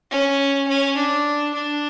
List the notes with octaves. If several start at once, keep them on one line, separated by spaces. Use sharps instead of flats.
C#4
C#4
D4
D4